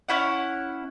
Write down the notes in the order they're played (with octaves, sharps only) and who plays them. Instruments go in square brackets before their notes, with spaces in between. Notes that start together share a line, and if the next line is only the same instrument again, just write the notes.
[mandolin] C#4 E4 F#5